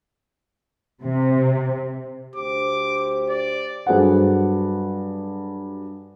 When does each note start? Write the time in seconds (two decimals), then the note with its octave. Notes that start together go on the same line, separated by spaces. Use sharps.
1.03 C3
2.36 D2 G4 C5 D6
3.30 D5
3.86 G2 F#3 G#4 A4 C5 F#5